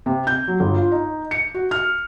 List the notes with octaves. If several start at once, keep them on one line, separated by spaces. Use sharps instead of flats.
C3
G6
F#3
G1
F4
D#4
C#7
F#4
F6